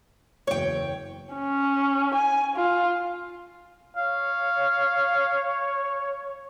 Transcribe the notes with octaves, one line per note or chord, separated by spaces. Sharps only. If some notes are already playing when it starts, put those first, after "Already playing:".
F#1 E2 C#5 G5
C#4
G#5
F4
C#5 F5